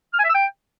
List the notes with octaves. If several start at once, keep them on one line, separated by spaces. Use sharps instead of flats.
F6
G#5
E5
E6
G5